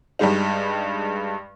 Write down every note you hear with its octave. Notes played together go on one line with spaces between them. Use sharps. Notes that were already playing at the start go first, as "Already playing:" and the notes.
G2 G3 G#3 D#4